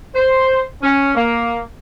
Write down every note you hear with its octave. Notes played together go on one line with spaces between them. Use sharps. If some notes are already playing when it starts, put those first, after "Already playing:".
C5
C#4
A#3